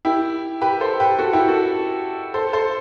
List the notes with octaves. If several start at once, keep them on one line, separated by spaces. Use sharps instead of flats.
E4 G4
G4 B4
A4 C5
G4 B4
F#4 A4
E4 G4
F#4 A4
A4 C5
A4 C5